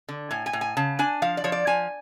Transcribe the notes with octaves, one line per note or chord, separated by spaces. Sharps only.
D3
A2 G#5
G#5
A2
G#5
C#3 A5
D4 G#5
F3 F5
D5
F3 C#5
D5
F3 G#5